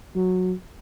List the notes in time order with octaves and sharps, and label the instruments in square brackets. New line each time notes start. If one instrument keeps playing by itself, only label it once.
[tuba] F#3